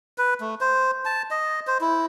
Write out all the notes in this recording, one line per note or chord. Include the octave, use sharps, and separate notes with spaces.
B4
A3
C5
A5
D#5
C5
E4